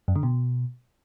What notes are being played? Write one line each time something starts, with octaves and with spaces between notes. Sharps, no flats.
F#2
D3
B2